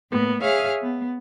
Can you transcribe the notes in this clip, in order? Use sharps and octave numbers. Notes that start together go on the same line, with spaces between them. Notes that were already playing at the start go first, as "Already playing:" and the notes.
A2 A#3 B3
G#4 C#5 E5 F5 F6
B3